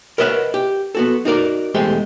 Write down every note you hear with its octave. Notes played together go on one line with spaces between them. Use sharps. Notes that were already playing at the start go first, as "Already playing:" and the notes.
A#4 B4 C#5 D#5 E5 F#5
G4
B3 F#4 A4
D#4 F#4 A#4 D5
E2 G#3 A3 G4 C5